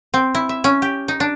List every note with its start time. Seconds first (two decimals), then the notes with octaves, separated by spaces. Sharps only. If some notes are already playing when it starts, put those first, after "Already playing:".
0.14 C4
0.35 E4
0.49 E5
0.64 C#4
0.82 G4
1.08 D#4
1.20 D4